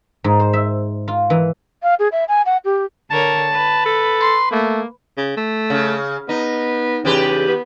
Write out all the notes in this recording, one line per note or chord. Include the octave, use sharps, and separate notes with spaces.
G#2
C5
E5
F4
E3
F5
G#4
E5
G#5
F#5
G4
D3 A#4 C#5 A5
B4
A4
C6
A3 A#3
C#3
A3
C#3
B3 D#4
E2 C#3 G4 B4
B3